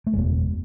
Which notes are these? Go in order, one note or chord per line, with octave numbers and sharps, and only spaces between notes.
A3
F#1 E2 B2 G#3